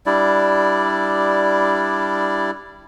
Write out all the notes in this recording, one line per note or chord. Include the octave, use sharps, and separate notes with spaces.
G3 D4 E4 D5